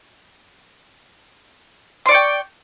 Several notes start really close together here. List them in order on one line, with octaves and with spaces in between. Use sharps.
C6 D5 C#6 G5